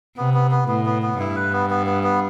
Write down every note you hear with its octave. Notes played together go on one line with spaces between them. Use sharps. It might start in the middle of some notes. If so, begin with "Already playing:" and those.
C3 B3
B3
B3
A2 B3
B3
B3
G2 E4
B4
B3
B3
B3
B3